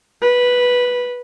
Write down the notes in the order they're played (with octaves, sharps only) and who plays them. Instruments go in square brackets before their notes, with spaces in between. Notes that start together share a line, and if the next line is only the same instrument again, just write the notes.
[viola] B4